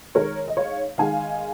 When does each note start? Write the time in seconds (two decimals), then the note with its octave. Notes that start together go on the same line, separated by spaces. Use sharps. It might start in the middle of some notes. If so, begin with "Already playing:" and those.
0.15 D#3 G#3 A#4 C#5
0.48 D#5
0.57 C#5 F5
0.98 D#3 G#3 F5 G#5